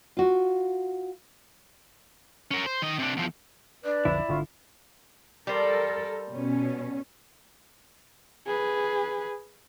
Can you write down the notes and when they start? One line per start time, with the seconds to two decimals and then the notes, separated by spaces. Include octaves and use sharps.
0.17 F4 F#4
2.51 C#4 A#4
2.66 C5
2.82 D#3 D#5
2.99 C3 D4
3.17 E2 F3
3.85 D4 B4 D5
4.05 B1 F2 D3 E4
4.28 G#1 D3 F4 C#6
5.47 G3 A4 A#4 C5
6.31 B2 C#4
8.46 G#4 B4